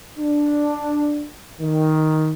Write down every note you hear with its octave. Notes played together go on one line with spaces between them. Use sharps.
D4
D#3